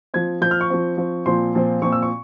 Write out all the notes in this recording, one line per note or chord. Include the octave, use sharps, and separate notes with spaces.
F3 C4 G#6
F3 C4 G6
F6
C#6
F3 C4
F3 C4
A#2 F3 C4 C6
A#2 F3 C4
A#2 F3 C4 C#6
E6
C#6